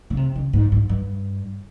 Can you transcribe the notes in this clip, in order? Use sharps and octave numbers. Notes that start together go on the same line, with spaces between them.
C#3
C3
C#3
G#2
G#2
G2